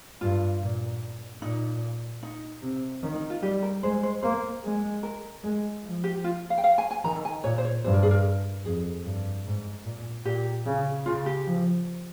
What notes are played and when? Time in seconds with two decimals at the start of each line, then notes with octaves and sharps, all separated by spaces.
0.21 G2 F4
0.61 A#2
1.42 A#2 D#4
2.23 D#4
2.62 C3
3.03 D#3 C#4
3.16 D#4
3.30 F4
3.42 G3 G4
3.63 A#4
3.83 G#3 C5
4.03 C5
4.23 A#3 C5
4.64 G#3
5.03 A#4
5.44 G#3
5.84 F3
6.04 G4
6.24 F4
6.50 F5
6.58 G5
6.64 F5
6.78 G#5
6.91 G#5
7.04 D#3 A#5
7.25 G#5
7.44 A#2 C#5
7.58 C5
7.65 C#5
7.84 G2 C5
7.94 A#4
8.03 G#4
8.11 A#4
8.65 F2 G#4
9.05 G2
9.46 G#2
9.85 A#2
10.25 A#2 G4
10.66 C#3
11.06 C#3 F4
11.26 G4
11.46 F3